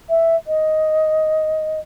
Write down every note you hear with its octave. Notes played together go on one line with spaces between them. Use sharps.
E5
D#5